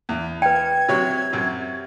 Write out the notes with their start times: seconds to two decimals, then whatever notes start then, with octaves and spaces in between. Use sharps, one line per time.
0.09 E2
0.42 B4 G5 G#6
0.88 C3 F#3 C#5
1.33 F#2 C3